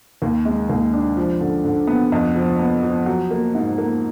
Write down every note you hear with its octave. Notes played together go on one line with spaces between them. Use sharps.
D#2
G#3
D#2
D4
F3
D3
D3
B3
F2
F3
B3
F3
F#3
A#3
G#2
A#3